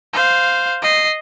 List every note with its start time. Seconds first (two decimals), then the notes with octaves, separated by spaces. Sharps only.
0.14 C5 F5
0.82 D#5 C7